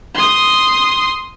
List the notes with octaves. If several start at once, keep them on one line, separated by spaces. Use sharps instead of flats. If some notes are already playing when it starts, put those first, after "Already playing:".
C6 D#6